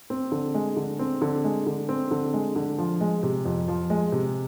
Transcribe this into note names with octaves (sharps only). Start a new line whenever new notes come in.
C4
D3
G#3
D3
C4
D3
G#3
D3
C4
D3
G#3
D3
F3
G#3
C3
F2
F3
G#3
C3